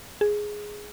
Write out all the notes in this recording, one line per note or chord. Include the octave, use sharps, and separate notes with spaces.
G#4